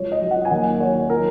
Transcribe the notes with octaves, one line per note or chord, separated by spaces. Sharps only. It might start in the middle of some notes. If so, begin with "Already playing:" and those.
Already playing: C#2 F#3 C#5
D#5
F#3
F#5
G#5
D#2 F#5
F#3 C#5
A#4